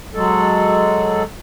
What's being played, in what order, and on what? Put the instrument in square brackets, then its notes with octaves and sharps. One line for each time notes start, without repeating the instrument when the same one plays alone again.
[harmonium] F#3 G#3 A4